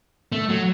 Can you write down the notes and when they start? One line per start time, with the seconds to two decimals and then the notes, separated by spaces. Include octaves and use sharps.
0.32 A3
0.49 F#3